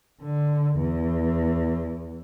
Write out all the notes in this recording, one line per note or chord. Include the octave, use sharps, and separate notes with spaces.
D3
E2